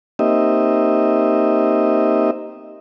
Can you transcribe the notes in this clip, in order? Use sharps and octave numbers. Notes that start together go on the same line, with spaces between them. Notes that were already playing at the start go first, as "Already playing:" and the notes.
A#3 C4 D#4 G4 D#5 E5